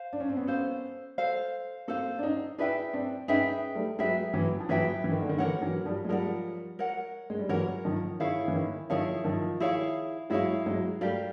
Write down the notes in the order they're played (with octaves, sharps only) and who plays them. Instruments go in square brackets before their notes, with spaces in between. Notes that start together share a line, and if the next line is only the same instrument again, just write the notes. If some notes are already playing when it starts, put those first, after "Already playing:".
Already playing: [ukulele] C5 F5
[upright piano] D4
C#4
C4
B3 C#4
[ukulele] A4 C5 F5
A4 C5 F5
[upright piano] A#3 C4 [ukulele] A4 C5 F5
[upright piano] D4
C#4 D#4
[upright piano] D4 E4 [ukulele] G#4 B4 E5 G5
[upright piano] C4 D4
[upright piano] C#4 D#4 [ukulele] G#4 B4 E5 G5
[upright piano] G3 A3
[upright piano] F#3 G#3 [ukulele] G#4 B4 E5 G5
[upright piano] E3 F#3
F3
[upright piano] E3 F#3 [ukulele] G#4 B4 E5 G5
[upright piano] E3
D#3
D3
D#3
[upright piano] D3 E3 [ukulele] A#4 C#5 F#5
[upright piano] E3 F#3
F3 G3
G#3
[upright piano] F3 G3 [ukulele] A#4 C#5 F#5
[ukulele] A#4 C#5 F#5
[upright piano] G#3
G3
[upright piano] E3 F#3 [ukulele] A#4 C#5 F#5
[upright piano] D#3 F3
[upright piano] D#3 [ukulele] E4 G#4 C#5 F5
[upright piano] E3
D#3
[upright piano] D#3 F3 [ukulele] E4 G#4 C#5 F5
[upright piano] D#3 F3
[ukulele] E4 G#4 C#5 F5
[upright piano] F#3 G#3 [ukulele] E4 G#4 C#5 F5
[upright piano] F#3 G#3
[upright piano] G3 A3 [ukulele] G4 A#4 D5 F5